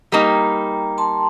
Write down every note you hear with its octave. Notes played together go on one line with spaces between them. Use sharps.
G3 A#3 D#4 G5 A#5
A5 C6